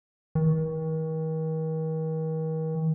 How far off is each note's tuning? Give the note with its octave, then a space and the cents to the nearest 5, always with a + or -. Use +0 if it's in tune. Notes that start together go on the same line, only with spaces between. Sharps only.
D#3 +40